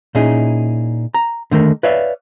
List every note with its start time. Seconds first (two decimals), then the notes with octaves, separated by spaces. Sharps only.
0.15 A#2 C#4 D#4 E4 G#4
1.14 A#5
1.51 D3 D#3 A3 A#4
1.83 B4 C#5 D5 E5 F5